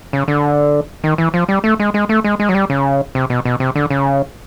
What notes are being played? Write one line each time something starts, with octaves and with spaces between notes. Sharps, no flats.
C#3
D3
D#3
E3
F3
G3
A3
G#3
G#3
A3
G#3
G#3
F#3
G3
C#3
C3
B2
B2
C3
D3
C#3